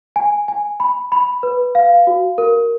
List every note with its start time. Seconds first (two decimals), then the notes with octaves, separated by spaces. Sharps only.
0.16 G#5
0.48 G#5
0.80 B5
1.12 B5
1.43 B4
1.75 F5
2.07 F#4
2.38 A#4